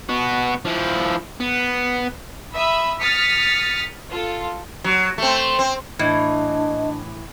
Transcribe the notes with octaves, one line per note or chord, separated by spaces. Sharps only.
B3 F#4
F3 E4
B3
E5 B5 D#6
D#6 F6 A6 B6 C#7
F4 A4
F#3
A3 C4
C4
A2 E3 D4 D#5